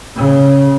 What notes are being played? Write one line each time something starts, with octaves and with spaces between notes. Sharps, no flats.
C#3